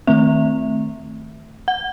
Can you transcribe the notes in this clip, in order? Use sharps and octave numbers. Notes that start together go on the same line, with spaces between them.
D#3 A3 C4 E5
F#5